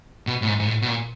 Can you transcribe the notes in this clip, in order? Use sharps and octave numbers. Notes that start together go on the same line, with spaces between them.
B2
A2
G#2
G#2
A2
B2
A#2